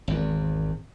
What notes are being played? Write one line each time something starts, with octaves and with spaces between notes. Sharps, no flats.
G#1 E2